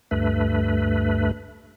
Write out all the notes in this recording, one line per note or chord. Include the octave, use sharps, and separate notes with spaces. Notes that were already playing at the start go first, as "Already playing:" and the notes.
D2 G2 A3 B4